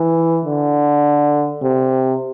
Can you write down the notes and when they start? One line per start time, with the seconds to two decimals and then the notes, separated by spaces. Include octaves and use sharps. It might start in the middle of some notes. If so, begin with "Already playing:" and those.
Already playing: E3
0.45 D3
1.62 C3